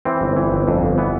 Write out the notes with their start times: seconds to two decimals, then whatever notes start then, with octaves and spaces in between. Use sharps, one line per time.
0.05 E3 C4
0.21 G1
0.36 E3
0.52 G1
0.68 F2
0.83 G1
0.98 E3 B3